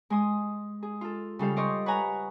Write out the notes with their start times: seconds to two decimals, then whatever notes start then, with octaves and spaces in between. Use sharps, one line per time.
0.10 G#3 G#5 C6 D#6
0.83 G#4
1.01 F4 A4
1.39 C#3 G3 A4 F5
1.56 C5 D5 D#5 C6 C#6
1.86 B4 C#5 F#5 G#5 A#5